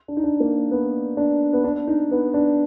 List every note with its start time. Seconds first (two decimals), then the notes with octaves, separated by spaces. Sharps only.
0.08 D4
0.17 D#4
0.24 D4
0.40 A#3
0.71 B3
1.17 D4
1.53 B3
1.64 D4
1.87 D#4
2.11 B3
2.34 D4